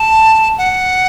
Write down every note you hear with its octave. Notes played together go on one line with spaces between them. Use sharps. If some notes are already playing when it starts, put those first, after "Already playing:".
Already playing: A5
F#5